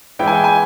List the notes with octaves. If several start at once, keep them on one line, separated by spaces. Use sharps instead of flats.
E3 G#3 B3 E4 G5
G#5
G5
G#5